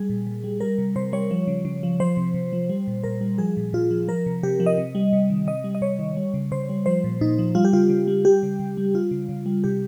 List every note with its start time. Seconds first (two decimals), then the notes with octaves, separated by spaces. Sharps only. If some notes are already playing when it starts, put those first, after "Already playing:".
Already playing: G3 G#4
0.09 A#2
0.27 A#2
0.44 G3
0.60 G3 A#4
0.78 C3
0.96 C3 C5
1.13 G3 C#5
1.31 F3
1.48 C#3
1.65 C#3
1.83 F3
2.00 F3 C5
2.17 C3
2.34 C3
2.53 F3
2.69 G3
2.87 A#2
3.04 A#2 A#4
3.21 G3
3.38 F3 G#4
3.57 A#2
3.73 A#2 F4
3.91 F3
4.09 F3 A#4
4.26 C3
4.43 C3 G4
4.60 F3
4.66 D#5
4.78 C3
4.95 G3
5.13 C3
5.30 D#3
5.47 C3 D#5
5.64 G3
5.75 D#5
5.81 C3 C#5
5.99 D#3
6.17 G3
6.34 C#3
6.51 C#3 C5
6.69 G3
6.86 F3 C5
7.04 A#2
7.21 A#2 D#4
7.39 F3
7.55 G3 F4
7.65 G4
7.73 C#3 F4
7.90 C#3
8.08 G3
8.25 G3 G4
8.43 C#3
8.59 C#3
8.77 G3
8.94 G3 F4
9.11 C#3
9.29 C#3
9.46 G3
9.64 C3 G4